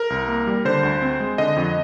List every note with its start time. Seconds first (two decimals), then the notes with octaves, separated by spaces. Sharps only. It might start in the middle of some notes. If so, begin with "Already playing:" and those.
Already playing: A#4
0.10 C2
0.28 A#3
0.47 G3
0.65 D3 C5
0.83 D2
1.02 C4
1.20 G#3
1.38 D3 D#5
1.56 F2